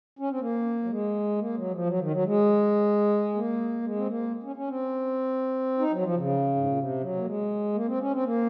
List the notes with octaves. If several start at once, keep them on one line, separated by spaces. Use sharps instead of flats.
C#4
C4
A#3
F#3
G#3
A#3
F#3
F3
F#3
D#3
F#3
G#3
A#3
G#3
C4
A#3
C#4
C#4
C4
D#4
F#3
F3
C#3
G#2
A#2
C3
F#3
A#3
G#3
A#3
C4
C#4
C4
A#3